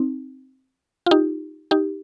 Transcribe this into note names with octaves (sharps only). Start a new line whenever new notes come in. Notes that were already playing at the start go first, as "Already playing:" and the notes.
Already playing: C4 D#4
F4
D#4 G4
D#4 G4